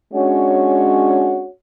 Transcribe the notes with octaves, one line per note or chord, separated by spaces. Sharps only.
G#3 C#4 D4 F#4 C#5